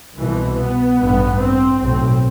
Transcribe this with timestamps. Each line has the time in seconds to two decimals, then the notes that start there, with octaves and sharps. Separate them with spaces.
0.18 C2 B2 E3
0.58 B3
1.00 A1 G2
1.40 C4
1.81 B1 A2 C4